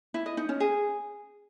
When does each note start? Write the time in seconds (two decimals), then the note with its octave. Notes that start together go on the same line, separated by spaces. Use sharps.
0.14 E4
0.26 D#5
0.37 D#4
0.49 C#4
0.60 G#4